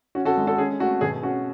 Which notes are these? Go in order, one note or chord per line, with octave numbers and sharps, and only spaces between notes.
C#4 F#4
F#4 A4
G#3
F#4 A4
C#4 G#4
A3 F#4
B2 G#4
C#4 F#4